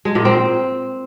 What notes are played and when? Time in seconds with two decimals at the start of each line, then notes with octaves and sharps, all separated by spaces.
0.05 G#3
0.15 A#2
0.25 C4